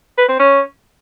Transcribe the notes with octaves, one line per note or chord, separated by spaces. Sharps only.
B4
C4
C#4